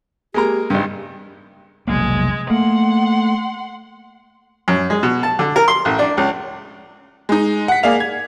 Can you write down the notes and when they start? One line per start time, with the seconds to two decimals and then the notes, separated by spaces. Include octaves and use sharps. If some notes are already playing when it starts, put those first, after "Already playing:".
0.34 G#3 A#3 G4 A#5
0.70 G#1 G2 G3
1.88 F1 B1 G#3 A#3
2.50 A3 A#3 F#5 C6
4.68 F#2
4.90 G#3
5.03 B2
5.23 A5
5.39 D3
5.56 A#4
5.68 C6
5.85 A1
5.99 D4
6.17 C#2
7.29 G#3 D#4
7.68 F#5 B6
7.83 A#3 G#4 D5 F5 F7
8.00 G#6